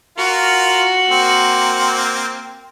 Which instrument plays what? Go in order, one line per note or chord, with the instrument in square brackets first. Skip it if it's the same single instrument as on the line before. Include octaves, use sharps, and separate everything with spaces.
[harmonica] F4 A#4 [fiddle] F#4
[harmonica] A#3 C4